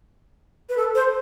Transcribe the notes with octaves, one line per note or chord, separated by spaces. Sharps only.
B4
A4
C5